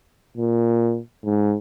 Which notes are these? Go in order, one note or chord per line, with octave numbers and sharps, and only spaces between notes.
A#2
G#2